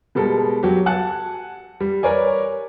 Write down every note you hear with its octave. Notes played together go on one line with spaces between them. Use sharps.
B2 G3 G#3 B3 A4 A#4
F#3 F#4 G4
F#5 G#5 A5 F#6
G3
A#4 B4 C#5 D5 G#5